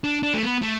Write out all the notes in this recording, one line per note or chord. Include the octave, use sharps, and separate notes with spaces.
D4
D4
A3
B3
A3